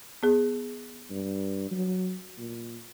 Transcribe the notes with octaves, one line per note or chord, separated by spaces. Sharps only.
B3 G#4
G2
F#3
A#2